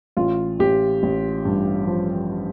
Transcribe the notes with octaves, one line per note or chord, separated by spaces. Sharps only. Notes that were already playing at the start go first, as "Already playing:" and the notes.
A1 F4
A1 G4
A1
G2
F3